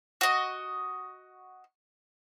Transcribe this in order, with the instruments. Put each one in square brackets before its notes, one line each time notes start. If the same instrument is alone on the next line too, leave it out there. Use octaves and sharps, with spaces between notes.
[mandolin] F#4 D#5